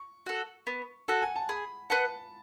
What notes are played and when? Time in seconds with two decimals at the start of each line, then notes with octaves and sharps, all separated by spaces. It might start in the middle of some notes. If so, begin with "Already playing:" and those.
Already playing: C#6
0.26 F#4 A4
0.67 B3
1.08 F#4 A4 F#5
1.22 G#5
1.36 A5
1.49 G#4 B5
1.90 B4 D#5 F#5 A5